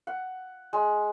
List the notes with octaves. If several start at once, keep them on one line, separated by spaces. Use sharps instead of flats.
F#5
G#3